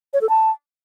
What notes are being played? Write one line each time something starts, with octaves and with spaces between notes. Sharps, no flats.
C#5
A4
A5